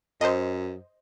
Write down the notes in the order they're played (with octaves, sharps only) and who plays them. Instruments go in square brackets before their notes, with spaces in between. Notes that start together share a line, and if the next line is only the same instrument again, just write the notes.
[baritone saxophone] F#2 [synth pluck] C5 D#5